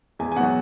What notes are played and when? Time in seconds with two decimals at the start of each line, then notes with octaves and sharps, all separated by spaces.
0.19 E2 G#5
0.32 G#5
0.36 B2 F#3 F#5